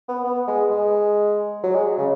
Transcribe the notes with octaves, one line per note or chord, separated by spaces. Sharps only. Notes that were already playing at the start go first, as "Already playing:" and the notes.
B3
B3
G#3
G#3
F#3
G#3
C#3